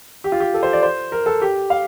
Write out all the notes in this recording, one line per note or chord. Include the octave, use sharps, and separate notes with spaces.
G4
F4
G4
A4
C5
D5
C5
A#4
A4
G4
F5